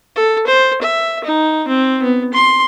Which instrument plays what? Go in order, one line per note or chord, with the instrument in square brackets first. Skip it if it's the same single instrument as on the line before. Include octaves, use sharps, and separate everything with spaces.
[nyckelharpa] A4
C5
E5
D#4
C4
B3
C6